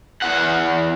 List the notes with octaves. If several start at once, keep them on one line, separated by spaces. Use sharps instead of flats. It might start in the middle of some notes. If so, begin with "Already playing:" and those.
E2 F#5